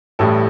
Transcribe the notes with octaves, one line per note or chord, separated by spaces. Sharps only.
A1 A2 G3 A4